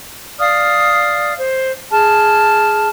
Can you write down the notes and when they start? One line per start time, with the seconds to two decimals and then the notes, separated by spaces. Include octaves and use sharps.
0.39 D5 F5 D#6 F6
1.38 C5
1.91 G#4 A5 F6